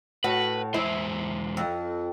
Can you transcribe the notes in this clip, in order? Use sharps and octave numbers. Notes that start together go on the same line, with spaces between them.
A2 F#4 B4
E2 G#3 E4 C5
F2